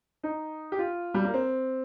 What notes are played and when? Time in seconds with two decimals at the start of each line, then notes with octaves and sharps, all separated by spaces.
0.23 D#4
0.72 G4
0.79 F4
1.14 G3
1.24 A#3
1.34 C4